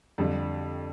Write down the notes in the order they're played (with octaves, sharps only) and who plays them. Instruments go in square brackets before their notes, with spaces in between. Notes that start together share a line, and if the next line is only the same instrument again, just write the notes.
[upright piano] F2 D3 G3